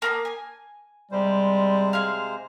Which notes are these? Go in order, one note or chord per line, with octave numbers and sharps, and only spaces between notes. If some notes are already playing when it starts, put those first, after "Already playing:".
A#3 A#5 D#6
G#5
C3 G3 G#3 C5
G#4 F5